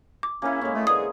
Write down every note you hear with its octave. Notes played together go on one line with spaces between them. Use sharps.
D6
C#3 A#3 C#4 E4
A2 G#3 A#3 C#4
A3 D#5
E2 D3 G#4 D#6